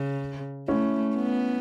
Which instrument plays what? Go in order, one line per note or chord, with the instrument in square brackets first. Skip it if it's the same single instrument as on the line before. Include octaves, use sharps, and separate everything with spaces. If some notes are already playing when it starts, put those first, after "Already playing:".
Already playing: [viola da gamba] C#3
[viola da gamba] A3 [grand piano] C#4 E4
[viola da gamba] B3